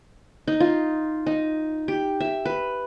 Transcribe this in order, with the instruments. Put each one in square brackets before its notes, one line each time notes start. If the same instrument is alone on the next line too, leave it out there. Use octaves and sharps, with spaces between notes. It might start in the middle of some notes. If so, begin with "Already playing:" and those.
[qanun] D#4
F4
D#4
G4
E5
B4